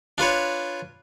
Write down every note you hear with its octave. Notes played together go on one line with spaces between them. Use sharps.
D4 F4 B4 C#5